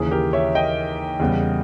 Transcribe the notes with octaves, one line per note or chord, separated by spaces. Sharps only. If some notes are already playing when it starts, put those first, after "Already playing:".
Already playing: D#2 C#3 E3 G#4
G4 A#4
C#5 E5
D#5 G5
E2 C#3 G3 B3